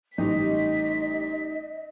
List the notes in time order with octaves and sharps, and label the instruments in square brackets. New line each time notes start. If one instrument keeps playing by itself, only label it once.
[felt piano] A1 G3 [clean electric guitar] D#4 [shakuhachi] D#5 [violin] B6